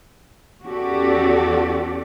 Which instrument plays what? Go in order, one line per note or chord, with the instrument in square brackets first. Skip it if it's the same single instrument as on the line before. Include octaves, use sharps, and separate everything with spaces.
[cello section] E2 C#4 F#4 G4 A4 D5